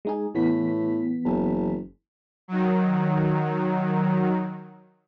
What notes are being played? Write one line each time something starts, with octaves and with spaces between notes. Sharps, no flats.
G#3 D#4 G#4
A2 E3 B3 B6
F#1
D#3 F#3